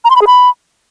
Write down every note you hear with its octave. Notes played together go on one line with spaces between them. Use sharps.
A#5
C6
B5
G#4
B5